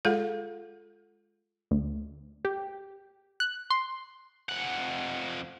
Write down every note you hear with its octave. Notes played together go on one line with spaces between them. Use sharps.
G#3 F4 G#4 A4 F5
D2
G4
F#6
C6
F2 F#5